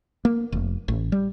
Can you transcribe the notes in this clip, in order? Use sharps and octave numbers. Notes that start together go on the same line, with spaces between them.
A#3
F1
A1
G3